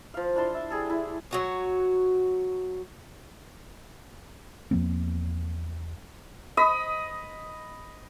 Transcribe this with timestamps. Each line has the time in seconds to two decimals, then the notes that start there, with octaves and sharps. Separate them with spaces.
0.14 F3 F5
0.36 D4 E4 A5 C6
0.54 E5
0.70 G3 G#4 A4
0.90 E4
1.31 F#3 F#4 C#5
4.71 E2 F3 A#3 C4
6.57 D#5 B5 D#6